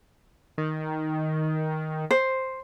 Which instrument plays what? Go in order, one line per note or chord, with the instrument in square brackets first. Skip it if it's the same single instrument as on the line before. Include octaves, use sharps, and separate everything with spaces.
[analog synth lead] D#3
[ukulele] C5